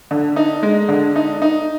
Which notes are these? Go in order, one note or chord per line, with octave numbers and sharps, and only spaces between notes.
D3
D#4
G#3
D3
D#4
D#4